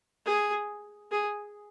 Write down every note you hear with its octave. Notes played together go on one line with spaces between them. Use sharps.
G#4
G#4